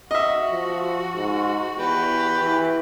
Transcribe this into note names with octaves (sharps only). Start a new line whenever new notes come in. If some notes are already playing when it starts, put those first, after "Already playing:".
F#4 D#5 E5
F3
G#2
E2 G4 B4
E3